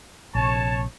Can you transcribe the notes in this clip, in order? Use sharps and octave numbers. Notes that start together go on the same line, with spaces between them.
A#1 C3 C#5 A5